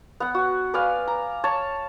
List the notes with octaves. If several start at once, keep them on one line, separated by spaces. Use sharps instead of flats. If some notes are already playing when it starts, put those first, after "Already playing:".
B3 F#5
F#4
B4 D5 F5 G#5
A#5
C#5 A5